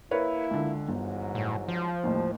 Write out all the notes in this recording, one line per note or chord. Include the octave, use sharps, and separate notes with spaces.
A#3 E4 A#4 B4 C#5
C#2 D3
G1 G#2 E3 F#3
A2
F3
A1 D#2 A#2 G3